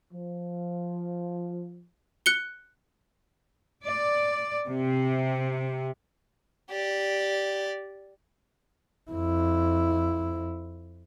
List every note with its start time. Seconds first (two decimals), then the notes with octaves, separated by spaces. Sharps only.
0.13 F3
2.26 F#6 C#7 G7
3.84 D5
4.68 C3
6.70 G4 D5
9.11 F2 E4